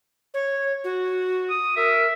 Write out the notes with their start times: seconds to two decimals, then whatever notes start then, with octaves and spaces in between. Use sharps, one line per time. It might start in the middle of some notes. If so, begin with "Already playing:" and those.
0.34 C#5
0.84 F#4
1.50 D#6
1.76 A#4 E5